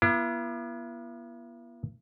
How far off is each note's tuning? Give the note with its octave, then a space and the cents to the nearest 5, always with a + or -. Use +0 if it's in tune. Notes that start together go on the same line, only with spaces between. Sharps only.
B3 -40 E4 +40